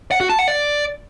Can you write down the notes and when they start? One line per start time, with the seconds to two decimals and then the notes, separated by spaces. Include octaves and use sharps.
0.11 F#5
0.21 F#4
0.30 A5
0.39 F#5
0.48 D5